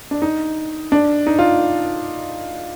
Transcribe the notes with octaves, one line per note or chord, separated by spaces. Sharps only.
D4
D#4
D4
D#4
F4